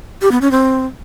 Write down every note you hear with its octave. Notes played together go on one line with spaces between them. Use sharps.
G4
B3
C#4
C4